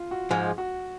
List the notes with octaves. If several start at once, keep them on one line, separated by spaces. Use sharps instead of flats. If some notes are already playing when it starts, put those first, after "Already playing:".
Already playing: F4
F#4
G#2 F3 G#3
F#4